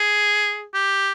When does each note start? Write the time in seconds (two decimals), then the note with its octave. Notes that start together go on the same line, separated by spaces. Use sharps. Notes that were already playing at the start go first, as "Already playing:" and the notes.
Already playing: G#4
0.74 G4